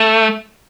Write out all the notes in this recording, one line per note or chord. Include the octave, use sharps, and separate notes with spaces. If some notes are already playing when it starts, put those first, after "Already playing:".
Already playing: A3